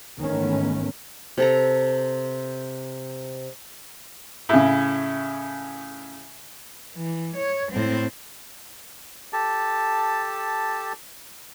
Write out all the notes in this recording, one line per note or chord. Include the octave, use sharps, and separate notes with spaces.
G#2 D#3 E3 A3 B3 C#4
C3 A4 A#5
A2 C#3
E3
C#5
A2 C4
G4 A4 A5